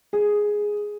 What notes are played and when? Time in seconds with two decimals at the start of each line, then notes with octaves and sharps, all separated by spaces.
0.13 G#4